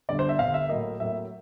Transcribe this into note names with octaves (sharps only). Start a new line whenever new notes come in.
G1 G2 D3 D5
C5
E5
G1 G2 D3 F5
E5
A2 F#3 A#3 D#5
A2 F#3 A#3 E5